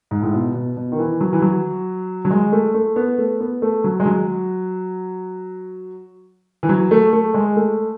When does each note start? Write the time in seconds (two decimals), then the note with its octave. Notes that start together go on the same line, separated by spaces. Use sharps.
0.11 G#2
0.23 A2
0.33 B2
0.54 B2
0.76 B2
0.92 D#3
0.99 E3
1.21 F#3
1.33 E3
1.42 F#3
2.25 F#3
2.31 G#3
2.52 A3
2.74 A3
2.96 B3
3.18 A3
3.40 B3
3.62 A3
3.84 F#3
4.00 G#3
4.06 F#3
6.63 E3
6.69 F#3
6.91 A3
7.13 A3
7.34 G#3
7.56 A3